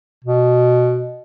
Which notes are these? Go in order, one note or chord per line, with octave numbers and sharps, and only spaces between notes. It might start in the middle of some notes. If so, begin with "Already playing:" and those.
B2